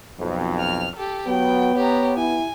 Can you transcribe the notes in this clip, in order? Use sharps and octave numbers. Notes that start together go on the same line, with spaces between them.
B1 F2
F6 F7
G4 A4
F#3 B3 G5
G4 C#5 A#5
E4 G#5